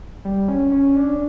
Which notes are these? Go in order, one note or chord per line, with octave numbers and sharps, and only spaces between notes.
G3
C#4
C#4
D4